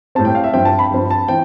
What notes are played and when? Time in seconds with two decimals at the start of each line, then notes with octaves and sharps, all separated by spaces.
0.15 A2 G3 C4 A5
0.25 G5
0.35 F5
0.44 E5
0.54 G2 F3 C4 G5
0.65 A5
0.79 B5
0.91 G2 F3 C4
1.11 A5
1.28 E3 C4 G5